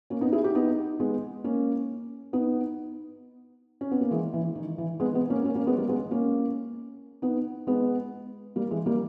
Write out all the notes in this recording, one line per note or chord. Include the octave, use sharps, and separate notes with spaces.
A#3 C#4
B3 D#4
E4 G#4
D#4 G4
B3 D#4
G#3 B3
A#3 C#4
B3 D#4
C#4
B3
A#3
E3 G#3
E3
D#3
E3
G#3 B3
G#3 B3
A#3 C#4
A#3 C#4
A#3 C#4
G#3 B3
G3 A#3
G#3 B3
A#3 C#4
B3 D#4
G#3 B3
G3 A#3
E3 G#3
G3 A#3